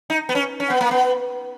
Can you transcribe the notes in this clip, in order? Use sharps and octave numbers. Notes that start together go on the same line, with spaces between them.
D#4
B3
C#4
C#4
B3
A#3
B3